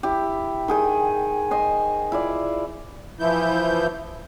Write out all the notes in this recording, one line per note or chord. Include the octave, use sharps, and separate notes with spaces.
E4 G4
D#3 G#4 G5
C5 D#5 G#5
E4 F4 D5
E3 F3 E4 G6